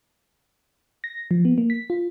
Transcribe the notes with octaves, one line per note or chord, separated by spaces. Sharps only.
A#6
F3
B3
A#3
B6
F4